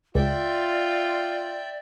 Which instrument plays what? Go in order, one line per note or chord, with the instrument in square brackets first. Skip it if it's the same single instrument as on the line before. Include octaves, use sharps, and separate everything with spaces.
[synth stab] C#2 [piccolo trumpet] F4 [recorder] D5 [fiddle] E5 G5